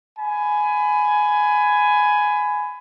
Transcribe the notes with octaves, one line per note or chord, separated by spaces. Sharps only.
G#5 B5